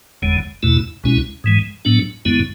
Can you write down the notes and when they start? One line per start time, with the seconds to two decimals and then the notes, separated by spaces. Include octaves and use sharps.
0.22 F#1 E2 D3 G#3
0.63 E2 B2 A3 E4
1.04 C#2 B2 G#3 C#4 E4
1.44 G#2 E3 G#3
1.85 A2 F#3 B3 D4
2.25 F#2 D3 G#3 B3 E4